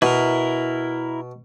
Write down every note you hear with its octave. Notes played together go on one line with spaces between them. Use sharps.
B2 E4 A#4